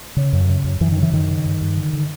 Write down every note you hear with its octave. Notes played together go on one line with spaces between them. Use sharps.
C#3
F#2
C#3
F#2
F#2 E3
D#3
C#3
E3
F#2 D#3
C#3
G2
G2
D3
D3